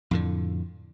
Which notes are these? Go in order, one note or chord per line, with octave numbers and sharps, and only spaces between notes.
F2 A2 D3